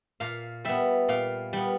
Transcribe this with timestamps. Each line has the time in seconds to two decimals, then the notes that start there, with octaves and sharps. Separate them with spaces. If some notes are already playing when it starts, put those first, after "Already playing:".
0.20 A#2 F5
0.65 G3 B3 E5
1.09 A#2 F5
1.53 G3 B3